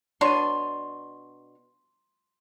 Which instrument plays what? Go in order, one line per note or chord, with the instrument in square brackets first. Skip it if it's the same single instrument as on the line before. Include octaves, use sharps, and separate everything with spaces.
[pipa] B2 D4 C#5 [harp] C6 D#7